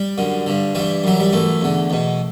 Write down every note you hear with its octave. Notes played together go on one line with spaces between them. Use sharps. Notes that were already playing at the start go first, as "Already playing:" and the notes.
Already playing: G3
F#2 D3
G2 D3
G2 E3 G3
F#2 E3 F#3
G3
F#2 E3 A3
E2 D3
E2 B2